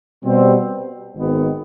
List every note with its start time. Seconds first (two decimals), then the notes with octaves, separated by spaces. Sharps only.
0.24 B2 G3 C4
1.16 G#1 G#2 D#3 B3